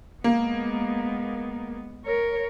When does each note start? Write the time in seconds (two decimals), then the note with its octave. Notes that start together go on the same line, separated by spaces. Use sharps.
0.24 G#3 A#3 B3
2.05 A#4 C#5